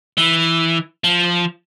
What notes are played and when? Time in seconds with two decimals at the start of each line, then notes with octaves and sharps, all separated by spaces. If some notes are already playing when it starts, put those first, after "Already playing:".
0.18 E3
1.04 F3